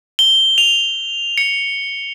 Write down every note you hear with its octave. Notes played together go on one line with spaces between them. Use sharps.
G7
F7
C#7